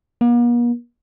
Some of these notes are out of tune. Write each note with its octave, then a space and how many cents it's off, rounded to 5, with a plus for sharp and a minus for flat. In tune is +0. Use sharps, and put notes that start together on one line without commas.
A#3 +45